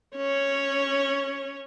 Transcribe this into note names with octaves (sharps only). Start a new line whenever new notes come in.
C#4 C#5